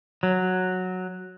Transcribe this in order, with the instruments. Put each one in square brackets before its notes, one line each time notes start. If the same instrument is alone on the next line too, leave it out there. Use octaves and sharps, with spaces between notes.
[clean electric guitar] F#3